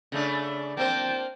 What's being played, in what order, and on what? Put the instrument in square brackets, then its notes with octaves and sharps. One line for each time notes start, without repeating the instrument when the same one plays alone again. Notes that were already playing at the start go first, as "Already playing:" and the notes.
[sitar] C#3 A3 D4
[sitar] A#3 C4 C5 [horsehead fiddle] G5 A5